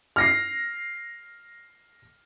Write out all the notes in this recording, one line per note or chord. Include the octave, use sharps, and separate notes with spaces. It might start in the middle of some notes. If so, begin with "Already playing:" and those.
F6 A#6 C7